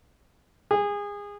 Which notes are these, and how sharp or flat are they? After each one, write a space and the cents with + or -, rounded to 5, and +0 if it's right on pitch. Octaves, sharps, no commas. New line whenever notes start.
G#4 -25